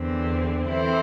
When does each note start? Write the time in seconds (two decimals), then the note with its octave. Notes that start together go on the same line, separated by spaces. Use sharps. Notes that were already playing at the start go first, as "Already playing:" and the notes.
Already playing: E2 D3 C4
0.68 E3 C4 E4 A4 C5